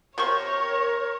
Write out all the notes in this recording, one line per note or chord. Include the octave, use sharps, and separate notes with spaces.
C3 A#4 C5 C#5 C#6